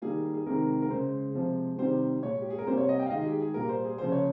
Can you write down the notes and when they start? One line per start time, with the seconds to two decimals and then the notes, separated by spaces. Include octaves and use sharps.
0.02 D#3 G3 A#3 G#4
0.34 G#4
0.46 C3 D#3 G#3 A#4
0.82 A#4
0.90 C#3 G#3 C5
1.34 C3 F3 G#3
1.78 C3 D#3 G3 C5
2.22 A#2 G#3 C#5
2.42 G4
2.50 G#4
2.58 A#4
2.66 C3 G3 A#3 C5
2.78 C#5
2.89 D#5
2.99 G5
3.06 F5
3.10 D#3 G#3 D#5
3.21 G#4
3.25 G4
3.40 G#4
3.54 A#2 G3 A#3 A#4
3.69 C5
3.84 G#4
3.98 C#3 F3 A#3 C5
4.12 C#5